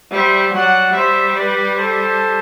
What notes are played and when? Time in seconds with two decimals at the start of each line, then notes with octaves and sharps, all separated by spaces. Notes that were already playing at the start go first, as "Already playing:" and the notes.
0.11 G3 C5 E5
0.53 F#3 D5 F#5
0.93 G3 C5 E5
1.34 B4 D5
1.74 A4 C5